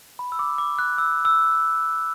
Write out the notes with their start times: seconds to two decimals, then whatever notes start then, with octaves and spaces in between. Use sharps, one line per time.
0.19 B5
0.32 E6
0.39 D6
0.58 D6
0.79 F#6
0.98 E6
1.25 E6